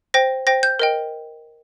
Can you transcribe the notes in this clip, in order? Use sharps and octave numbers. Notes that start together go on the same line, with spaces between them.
C5 G5 A#6
C5 G5 A#6
G6
A#4 D#5 G5